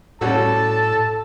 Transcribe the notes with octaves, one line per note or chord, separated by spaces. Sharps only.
A2 G3 C#4 F#4 A4 A5